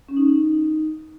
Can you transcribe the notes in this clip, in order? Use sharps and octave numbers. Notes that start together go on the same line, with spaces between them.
C#4
D#4